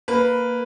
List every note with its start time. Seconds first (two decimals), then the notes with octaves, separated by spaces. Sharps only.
0.08 A#3 B4